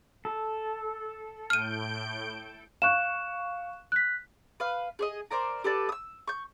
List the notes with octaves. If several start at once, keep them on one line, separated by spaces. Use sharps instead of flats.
A4
A2 F6 G6 D7 D#7
F5 C#6 F#6 E7
F#6 B6
B4 F5
G#4 C#5 D#5
A#4 C5 D5 A#5
G4 A4 B4 D5
D#6 E6
C#6 G6